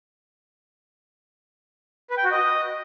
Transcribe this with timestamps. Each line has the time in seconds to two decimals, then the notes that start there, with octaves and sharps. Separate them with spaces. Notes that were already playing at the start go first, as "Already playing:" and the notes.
2.10 B4
2.17 G5
2.24 F#4
2.31 D#5